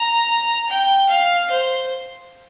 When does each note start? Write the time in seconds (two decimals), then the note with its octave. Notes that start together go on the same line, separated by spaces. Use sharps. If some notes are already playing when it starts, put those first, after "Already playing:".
Already playing: A#5
0.70 G5
1.10 F5
1.51 C5